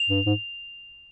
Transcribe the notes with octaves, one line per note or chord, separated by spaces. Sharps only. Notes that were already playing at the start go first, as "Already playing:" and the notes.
Already playing: F7
G2
G#2